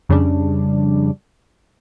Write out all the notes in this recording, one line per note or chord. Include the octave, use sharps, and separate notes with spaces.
F2 C#3 G3 D4